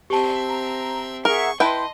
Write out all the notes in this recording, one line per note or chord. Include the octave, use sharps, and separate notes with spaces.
C4 G4 E5 A5
A#5
G#4 A#4 E5 F#5 C#6
E4 B4 D#5 G5 A5 C6